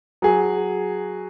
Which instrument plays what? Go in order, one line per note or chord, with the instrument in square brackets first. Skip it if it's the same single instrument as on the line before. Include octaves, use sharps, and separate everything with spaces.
[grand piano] F#3 G#4